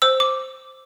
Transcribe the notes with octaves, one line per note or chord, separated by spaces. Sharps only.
C5 E6
D6